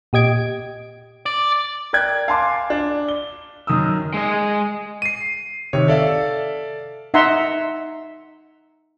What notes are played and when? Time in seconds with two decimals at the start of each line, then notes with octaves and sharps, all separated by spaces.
0.13 A#2 G4 D#5 G#6 D7
1.26 D5
1.93 A#4 D5 G5 F#6 G#6
2.28 F5 G#5 A5 C6 D6
2.70 D4
3.09 G7
3.67 F#2 D#3 D#6 E6
4.14 G#3 D#5
5.02 C7 D#7
5.73 C3 D#3 C#5
5.88 A4 D5 E5 F5
7.14 D#4 E5 F#5 A#5 C6